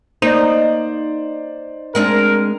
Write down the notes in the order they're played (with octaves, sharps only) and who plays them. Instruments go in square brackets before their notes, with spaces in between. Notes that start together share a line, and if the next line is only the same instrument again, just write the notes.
[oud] A#3 [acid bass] D#4 [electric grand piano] C5 D5
[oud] G#3 C4 D4 [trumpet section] A#4